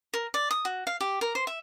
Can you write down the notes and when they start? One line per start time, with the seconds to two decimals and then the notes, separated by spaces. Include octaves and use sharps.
0.14 A#4
0.34 D5
0.51 D#6
0.65 F#4
0.87 F5
1.01 G4
1.21 A#4
1.35 C5
1.47 E5